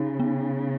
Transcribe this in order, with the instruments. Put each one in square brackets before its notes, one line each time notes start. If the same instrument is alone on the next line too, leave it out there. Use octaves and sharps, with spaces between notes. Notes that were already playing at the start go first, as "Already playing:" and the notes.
Already playing: [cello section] C#3 [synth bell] D#4
[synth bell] B3